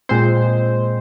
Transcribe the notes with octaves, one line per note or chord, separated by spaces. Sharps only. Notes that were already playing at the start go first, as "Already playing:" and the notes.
A#2 G#3 C4 C5